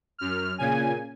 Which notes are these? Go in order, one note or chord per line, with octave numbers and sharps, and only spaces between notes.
F#2 F6
A#2 C#3 G#5